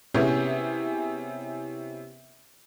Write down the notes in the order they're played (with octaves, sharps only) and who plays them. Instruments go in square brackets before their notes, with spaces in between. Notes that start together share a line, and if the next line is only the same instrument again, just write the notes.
[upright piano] C3 B3 C#4 E4 G4 G#4